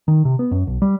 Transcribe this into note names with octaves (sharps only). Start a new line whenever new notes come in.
D#3
C3
B3
F#2
B1
G3